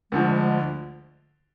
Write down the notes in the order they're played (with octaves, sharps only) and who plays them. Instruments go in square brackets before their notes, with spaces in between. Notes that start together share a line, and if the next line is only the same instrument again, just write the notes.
[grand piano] D2 D3 F3 [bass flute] G#3